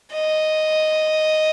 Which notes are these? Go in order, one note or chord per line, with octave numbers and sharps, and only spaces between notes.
D#5